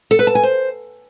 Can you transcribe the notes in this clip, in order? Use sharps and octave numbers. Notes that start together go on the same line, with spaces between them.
A4
B4
A5
G#5
C5